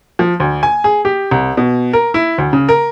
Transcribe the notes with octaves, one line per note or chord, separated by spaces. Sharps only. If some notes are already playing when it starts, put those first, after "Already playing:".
F3
D2
G#5
G#4
G4
C2
B2
A#4
E4
D2
C#3
A#4